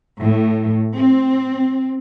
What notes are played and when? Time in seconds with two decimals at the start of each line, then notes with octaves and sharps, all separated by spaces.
0.20 A2
0.95 C4